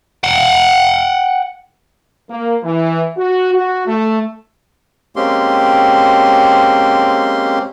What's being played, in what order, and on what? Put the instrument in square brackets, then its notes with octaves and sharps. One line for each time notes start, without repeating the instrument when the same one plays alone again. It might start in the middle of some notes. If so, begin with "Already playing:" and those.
[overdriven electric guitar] F#5 G5
[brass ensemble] A#3
E3
F#4
F#4
A3
[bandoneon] G#3 A#3 C4 C#4 G4 C6